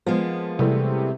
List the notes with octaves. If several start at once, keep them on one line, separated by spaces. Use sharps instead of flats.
F3 G#3 A#3 B3
C3 E3 G3 A3